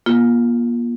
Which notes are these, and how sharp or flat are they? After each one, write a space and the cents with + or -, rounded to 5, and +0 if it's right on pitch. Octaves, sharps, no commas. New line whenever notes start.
A#3 +40 F4 +0